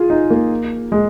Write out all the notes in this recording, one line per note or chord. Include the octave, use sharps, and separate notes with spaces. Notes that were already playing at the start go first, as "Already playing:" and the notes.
Already playing: F4 G#4
D#4
A#3
G#3